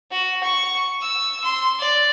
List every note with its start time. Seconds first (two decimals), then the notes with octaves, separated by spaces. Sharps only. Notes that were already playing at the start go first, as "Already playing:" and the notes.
0.12 F#4
0.43 C#6
1.01 E6
1.44 C6
1.79 D5